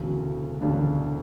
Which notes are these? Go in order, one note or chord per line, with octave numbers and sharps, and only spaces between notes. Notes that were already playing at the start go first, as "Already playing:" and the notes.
Already playing: E1 D2 C#3 F#4
E1 D2 C#3 D4